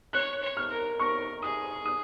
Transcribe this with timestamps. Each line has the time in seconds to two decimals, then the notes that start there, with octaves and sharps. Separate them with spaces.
0.13 C#5 F#6
0.43 C#5
0.57 F6
0.70 A#4
0.99 A#4 C#6
1.42 G#4 D#6
1.85 D#6